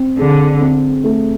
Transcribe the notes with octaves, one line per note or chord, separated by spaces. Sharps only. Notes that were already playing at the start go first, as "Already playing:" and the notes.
Already playing: C4
D3 G#4
C4
A3